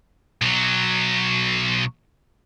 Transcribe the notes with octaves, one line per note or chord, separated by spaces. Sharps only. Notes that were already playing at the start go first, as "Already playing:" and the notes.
B1 F#3